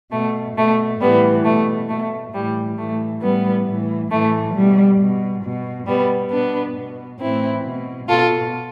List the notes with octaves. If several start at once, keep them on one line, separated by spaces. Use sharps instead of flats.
B2 A3
B2 A3
A2 E3 G3 B3
B2 A3
B2 A3
A2 E3 G3
A2 E3 A3
A2 E3 G3 B3
A2 E3
A2 E3 A3
B2 G3
B2
B2
B2 G3 B3
B2 B3 D4
B2
A2 E3 C4 E4
B2
B2 F4 A4